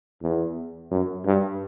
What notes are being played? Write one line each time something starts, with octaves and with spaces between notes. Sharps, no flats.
E2
F#2
G2